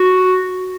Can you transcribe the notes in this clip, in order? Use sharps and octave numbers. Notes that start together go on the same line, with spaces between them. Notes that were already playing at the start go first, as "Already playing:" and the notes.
Already playing: F#4